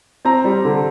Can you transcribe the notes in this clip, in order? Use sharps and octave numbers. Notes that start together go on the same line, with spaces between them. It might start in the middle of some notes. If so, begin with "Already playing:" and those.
C4 A#5
G3
D3